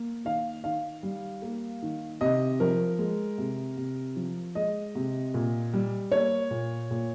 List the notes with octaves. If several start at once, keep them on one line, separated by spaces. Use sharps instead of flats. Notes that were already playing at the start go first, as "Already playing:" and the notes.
Already playing: A#3
D#3 F5
D#3 F5
G3
A#3
D#3
C3 D#5
F3 A#4
G#3
C3
C3
F3
G#3 D#5
C3
A#2
G3
A#3 C#5
A#2
A#2